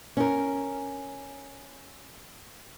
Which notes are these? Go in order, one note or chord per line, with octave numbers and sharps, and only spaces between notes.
C#4 A#4